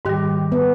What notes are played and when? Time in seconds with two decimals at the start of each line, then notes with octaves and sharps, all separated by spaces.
0.05 G#2 D#3 G3 G4
0.52 B3